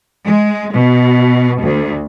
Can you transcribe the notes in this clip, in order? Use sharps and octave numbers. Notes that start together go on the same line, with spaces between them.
G#3
B2
D2